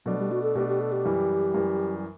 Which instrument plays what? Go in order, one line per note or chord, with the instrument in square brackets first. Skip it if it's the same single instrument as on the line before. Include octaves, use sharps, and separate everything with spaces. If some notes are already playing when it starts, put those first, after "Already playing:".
[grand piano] B2 A3 D4 [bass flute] F#3
[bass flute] G3
F#4
A4
[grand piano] B2 A3 D4 [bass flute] G4
[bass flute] G4
A4
G4
[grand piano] F#2 E3 G3
F#2 E3 G3